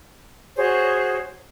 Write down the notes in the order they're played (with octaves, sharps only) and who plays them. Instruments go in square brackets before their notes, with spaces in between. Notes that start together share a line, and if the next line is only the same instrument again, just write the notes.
[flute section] F#4 G#4 C5 C#5